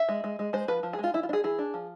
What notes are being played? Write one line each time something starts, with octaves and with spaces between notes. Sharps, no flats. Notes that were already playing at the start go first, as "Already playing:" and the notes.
Already playing: E5
G#3
G#3
G#3
G#3 C5
F3 B4
F3
G#4
G#3 F4
E3 E4
F4
D4
G#4
E3 G#4
D4
F3